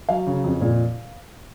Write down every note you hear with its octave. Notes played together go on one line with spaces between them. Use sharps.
F#3 F5
C#3
F2
A#2